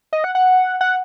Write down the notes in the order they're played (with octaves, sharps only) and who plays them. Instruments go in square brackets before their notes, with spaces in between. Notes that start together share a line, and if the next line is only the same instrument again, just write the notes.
[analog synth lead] D#5
F#5
F#5
F#5